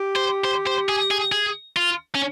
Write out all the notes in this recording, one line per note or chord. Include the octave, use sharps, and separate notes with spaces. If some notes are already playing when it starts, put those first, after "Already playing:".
Already playing: G4
C5
C5
C5
G#4
G#4
G#4
F4
C#4